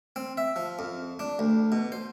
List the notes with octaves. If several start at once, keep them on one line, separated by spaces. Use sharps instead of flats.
C4
E5
F3
F2
D4
D2
B2
C5